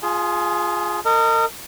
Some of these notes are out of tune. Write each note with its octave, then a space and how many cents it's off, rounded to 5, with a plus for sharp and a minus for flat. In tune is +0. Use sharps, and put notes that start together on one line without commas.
F4 +0 G#4 +0 G#5 +45
A#4 -35 D#5 +0